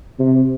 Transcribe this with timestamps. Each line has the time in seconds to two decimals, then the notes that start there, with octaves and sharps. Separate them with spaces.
0.19 C3